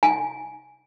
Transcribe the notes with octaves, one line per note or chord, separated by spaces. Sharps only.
G#5